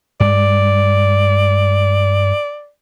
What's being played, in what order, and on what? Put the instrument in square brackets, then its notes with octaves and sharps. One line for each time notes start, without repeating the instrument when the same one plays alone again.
[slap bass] G2 G#3 [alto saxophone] D5